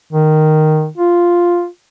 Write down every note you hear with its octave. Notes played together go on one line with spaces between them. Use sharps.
D#3
F4